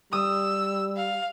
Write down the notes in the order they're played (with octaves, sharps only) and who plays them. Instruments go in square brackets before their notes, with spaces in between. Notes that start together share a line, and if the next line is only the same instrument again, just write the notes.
[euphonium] G3 [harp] D#6 [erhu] E6
[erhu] F5